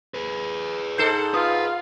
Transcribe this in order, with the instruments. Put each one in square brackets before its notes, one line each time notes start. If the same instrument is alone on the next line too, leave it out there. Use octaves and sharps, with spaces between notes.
[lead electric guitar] G#4 B4
[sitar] G#2 A4 [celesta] G6 C7 E7
[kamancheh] F4 [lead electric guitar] B4 [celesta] D#6